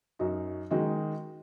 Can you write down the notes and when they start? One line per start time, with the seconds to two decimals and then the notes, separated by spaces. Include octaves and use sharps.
0.19 F#2 F#3 D#4 F#4
0.71 D#3 G#3 D#4 F#4